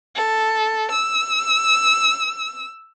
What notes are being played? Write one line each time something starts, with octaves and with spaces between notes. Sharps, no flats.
A4
E6